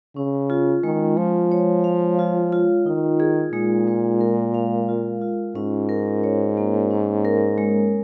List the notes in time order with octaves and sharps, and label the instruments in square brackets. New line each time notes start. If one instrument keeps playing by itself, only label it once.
[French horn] C#3 [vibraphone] C#4
[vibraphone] F4
[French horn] D#3 [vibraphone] G#3
[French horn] F3 [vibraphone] G#3
[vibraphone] C#5
F5
F4
F4
[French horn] D#3 [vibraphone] D#4
[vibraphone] G#4
[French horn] A#2 [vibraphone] G#3
[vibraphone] G#3
A#4
F5
F4
F4
[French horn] G#2 [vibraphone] C#4
[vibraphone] A#4
C#5
A#3
C#4
A#4
G#3